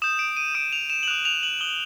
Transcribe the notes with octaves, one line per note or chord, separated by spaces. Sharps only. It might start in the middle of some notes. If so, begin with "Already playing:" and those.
D#6 G6 E7
D7
D#7
D#6 G6 D7
F7
E7
F#7
D#6 F#6 F7
F7
F#7
D#6 F#6 G7